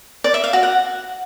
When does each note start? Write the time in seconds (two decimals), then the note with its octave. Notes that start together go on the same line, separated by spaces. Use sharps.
0.24 D5
0.34 E5
0.44 F5
0.53 F#4
0.63 F#5